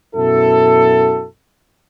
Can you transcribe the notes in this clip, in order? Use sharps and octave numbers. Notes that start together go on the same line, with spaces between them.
F#2 B2 F#3 E4 F#4 A4